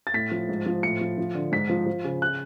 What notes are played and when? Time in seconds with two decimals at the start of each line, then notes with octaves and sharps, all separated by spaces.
0.07 A6
0.14 A2 B6
0.31 F3
0.49 G#2
0.66 F3
0.83 A2 C#7
1.01 F3
1.18 F3
1.35 D3
1.52 G#2 B6
1.69 F3
1.86 F3
2.04 C#3
2.22 F#6